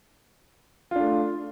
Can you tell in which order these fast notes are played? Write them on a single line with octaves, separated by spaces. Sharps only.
F4 D4 A3